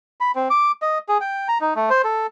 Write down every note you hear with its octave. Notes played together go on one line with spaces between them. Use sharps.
B5
C4
D6
D#5
G#4
G5
A#5
D#4
A3
C5
A4